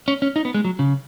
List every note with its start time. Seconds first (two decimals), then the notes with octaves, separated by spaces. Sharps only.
0.08 C#4
0.22 C#4
0.36 D#4
0.45 B3
0.54 G#3
0.65 F#3
0.79 C#3